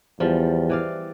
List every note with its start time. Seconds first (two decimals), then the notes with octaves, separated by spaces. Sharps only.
0.20 E2 F3 G3
0.69 E3 D5 F5